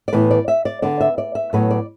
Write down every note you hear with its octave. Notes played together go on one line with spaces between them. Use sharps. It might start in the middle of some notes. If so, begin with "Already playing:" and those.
D5
A2 E3 B3 B4
D5
E5
D5
D3 B3 D5
E5
D5
E5
A2 F#3 B3 B4
D5